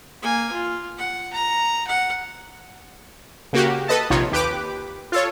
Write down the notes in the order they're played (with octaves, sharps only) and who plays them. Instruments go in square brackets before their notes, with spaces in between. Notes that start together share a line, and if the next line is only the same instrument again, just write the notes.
[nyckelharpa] A#3 G#5
F4
F#5
A#5
F#5
[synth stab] C#3 A#3 F#4 G4
A4 B4 D#5 A5
A#1 C3 D#3 F4 C#5
D#2 G4 B4 D6
F4 A4 C#5